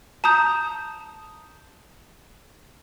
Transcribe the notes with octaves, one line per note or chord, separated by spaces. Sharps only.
A5 A#5 D#6 G6